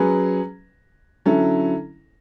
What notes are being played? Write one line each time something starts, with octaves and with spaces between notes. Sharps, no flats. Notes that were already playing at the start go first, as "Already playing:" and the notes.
Already playing: F#3 C#4 G#4 B4
D3 F#3 C#4 E4 A4